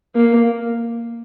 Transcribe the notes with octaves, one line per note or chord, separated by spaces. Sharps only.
A#3